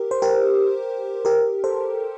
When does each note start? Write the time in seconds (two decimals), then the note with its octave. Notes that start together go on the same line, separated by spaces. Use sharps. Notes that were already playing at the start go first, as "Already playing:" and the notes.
Already playing: G4 A#4
0.11 C5
0.22 G4 A#4
1.25 G4 A#4
1.64 A4 C5